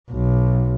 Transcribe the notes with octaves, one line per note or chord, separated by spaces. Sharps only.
B1